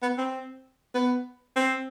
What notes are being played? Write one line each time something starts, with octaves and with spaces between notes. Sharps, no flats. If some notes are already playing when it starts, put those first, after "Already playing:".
B3
C4
B3
C4